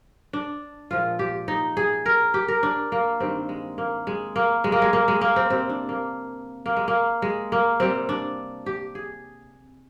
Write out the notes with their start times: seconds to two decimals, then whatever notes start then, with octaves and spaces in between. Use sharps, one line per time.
0.33 D4
0.91 A#2 F3 G#3 F4
1.19 G4
1.48 D#4
1.77 G#4
2.06 A#4
2.34 G4
2.48 A#4
2.63 D4
2.92 A#3
3.20 G2 D#3 G3 C4
3.49 G#3
3.78 A#3
4.07 G#3
4.36 A#3
4.64 G#3
4.72 A#3
4.82 G#3
4.93 A#3
5.08 G#3
5.21 A#3
5.36 C4
5.50 C3 G3 C4
5.69 D4
5.89 A#3
6.66 A#3
6.76 G#3
6.88 A#3
7.22 G#3
7.52 A#3
7.80 C3 G3 C4
8.09 D4
8.66 G4
8.95 G#4